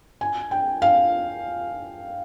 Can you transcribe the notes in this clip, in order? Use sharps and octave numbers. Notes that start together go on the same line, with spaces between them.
G#5
G5
F5